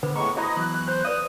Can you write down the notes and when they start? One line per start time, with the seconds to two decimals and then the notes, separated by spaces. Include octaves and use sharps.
0.03 D3 B3 B4 C5
0.16 A2 G#3 B3 A#5 C#6 D6
0.37 E4 F#4 C5 D#5 E5 A#5 B5
0.56 E3 F#3 B3 F#6
0.88 C5 B5
1.05 B4 D5 E5 D#6